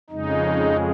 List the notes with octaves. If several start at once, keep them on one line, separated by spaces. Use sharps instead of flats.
F2 C#3 G#3 D#4